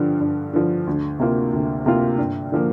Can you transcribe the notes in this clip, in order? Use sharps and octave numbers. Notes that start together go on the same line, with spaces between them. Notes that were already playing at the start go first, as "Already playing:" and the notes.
Already playing: G2 D3 F3
G2
D3 F3
D2
C3 A#3 F4
D2
C3 A#3 F4
G2
D3 F3 A#3